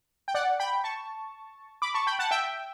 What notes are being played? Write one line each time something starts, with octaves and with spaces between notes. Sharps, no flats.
G5
D5 F#5
G5 B5
A5 C#6
B5 D6
A5 C#6
G5 B5
F#5 A5
E5 G5